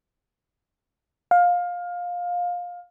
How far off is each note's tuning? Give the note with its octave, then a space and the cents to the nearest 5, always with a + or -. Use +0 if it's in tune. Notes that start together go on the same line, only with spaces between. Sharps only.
F5 +20